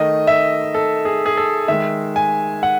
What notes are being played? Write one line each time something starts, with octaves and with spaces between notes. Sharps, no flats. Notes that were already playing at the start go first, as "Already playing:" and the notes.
Already playing: D#3 A3 D#5
E5
A4
G#4
G#4
A4
D#3 G#3 E5
G#5
F#5